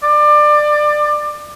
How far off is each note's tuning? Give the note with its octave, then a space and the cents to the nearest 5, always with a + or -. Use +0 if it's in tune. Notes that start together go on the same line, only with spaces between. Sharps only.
D5 +25